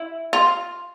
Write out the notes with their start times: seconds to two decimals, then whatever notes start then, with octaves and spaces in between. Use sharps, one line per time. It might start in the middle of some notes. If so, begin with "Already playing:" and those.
Already playing: E4
0.33 F4